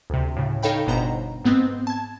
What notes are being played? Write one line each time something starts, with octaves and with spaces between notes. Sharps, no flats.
D2 C3
A2 C#3
D#4 A4 C#5 F5 G5 B5
G1 B2 C5 A#5
G#2 B3 C4
A5 G#6